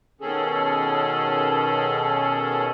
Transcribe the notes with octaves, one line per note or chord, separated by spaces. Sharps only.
B2 D#3 C#4 G#4 A4